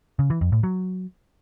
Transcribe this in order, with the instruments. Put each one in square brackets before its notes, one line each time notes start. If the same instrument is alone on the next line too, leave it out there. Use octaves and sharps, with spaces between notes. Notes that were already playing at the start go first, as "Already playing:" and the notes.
[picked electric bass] C#3
E3
F2
A2
F#3